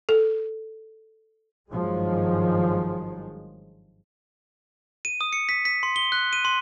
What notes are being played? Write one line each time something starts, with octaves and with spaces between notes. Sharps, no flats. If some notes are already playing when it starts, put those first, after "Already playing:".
A4
G#1 G2 D#3 F3 F#3 G#3
D#7
D#6
C#7
B6
B6
C6
G7
F#6
D#7
C6